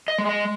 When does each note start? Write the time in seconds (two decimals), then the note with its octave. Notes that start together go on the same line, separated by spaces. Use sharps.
0.08 D#5
0.18 G#3
0.29 D#5